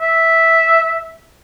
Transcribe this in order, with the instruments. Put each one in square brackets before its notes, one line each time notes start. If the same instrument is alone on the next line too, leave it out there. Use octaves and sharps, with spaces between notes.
[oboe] E5